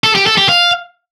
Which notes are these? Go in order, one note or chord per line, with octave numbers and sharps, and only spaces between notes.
A4
G4
A4
G4
F5